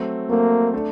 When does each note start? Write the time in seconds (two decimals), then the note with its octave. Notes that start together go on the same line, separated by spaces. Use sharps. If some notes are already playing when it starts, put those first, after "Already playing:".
Already playing: F#3 A3 C4
0.29 F#3 A3 A#3 C4
0.73 A3 D4 A4